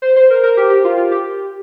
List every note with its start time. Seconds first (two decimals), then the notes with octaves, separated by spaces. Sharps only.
0.02 C5
0.16 C5
0.30 A#4
0.43 A#4
0.57 G4
0.70 G4
0.84 F4
0.98 F4
1.11 G4